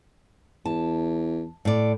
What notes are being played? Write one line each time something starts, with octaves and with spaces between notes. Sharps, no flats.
E2 A5
A2 D5